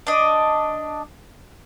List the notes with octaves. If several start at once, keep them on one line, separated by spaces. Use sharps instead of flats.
D4 D#5